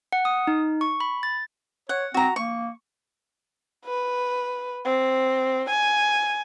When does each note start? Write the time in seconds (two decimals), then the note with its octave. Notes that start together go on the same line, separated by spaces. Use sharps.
0.12 F#5
0.25 D#6
0.47 D#4
0.81 C#6
1.00 B5
1.23 A6
1.89 C#5 F#5
2.14 C4 F#4 A#5
2.36 A#3 C#6
3.85 B4
4.86 C4
5.70 G#5